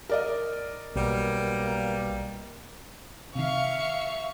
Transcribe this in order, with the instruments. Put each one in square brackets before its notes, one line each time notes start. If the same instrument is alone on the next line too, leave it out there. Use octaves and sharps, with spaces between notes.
[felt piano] A#4 D5 D#5
[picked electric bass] B1 [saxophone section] G3 A#3
[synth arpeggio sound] C3 D#3 [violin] E5 C#6 [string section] F5